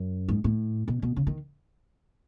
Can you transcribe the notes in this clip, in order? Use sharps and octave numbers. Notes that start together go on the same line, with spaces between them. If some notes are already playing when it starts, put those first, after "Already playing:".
Already playing: F#2
G#2
A2
B2
B2
C#3
D#3